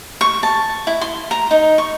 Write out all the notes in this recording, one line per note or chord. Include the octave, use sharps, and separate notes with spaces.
C#6
A5
E4
C6
A#5
D#4
C#6